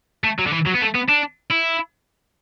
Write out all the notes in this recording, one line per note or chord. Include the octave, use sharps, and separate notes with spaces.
A3
F#3
D3
E3
F#3
B3
A3
B3
D4
E4